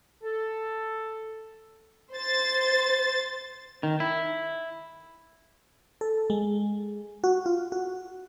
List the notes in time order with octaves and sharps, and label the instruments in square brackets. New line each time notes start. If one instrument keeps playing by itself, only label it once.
[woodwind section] A4
[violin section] C5 A6
[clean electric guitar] D#3
E4
[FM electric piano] A4
G#3
F#4
F4
F#4